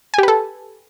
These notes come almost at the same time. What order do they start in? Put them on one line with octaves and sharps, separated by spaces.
G#5 G4 B4 A4